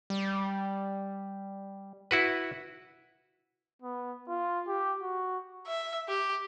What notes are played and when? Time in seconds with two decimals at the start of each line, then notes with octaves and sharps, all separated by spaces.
0.10 G3
2.11 E4 F#4 B4
3.82 B3
4.28 F4
4.68 G4
5.01 F#4
5.67 E5
6.09 G4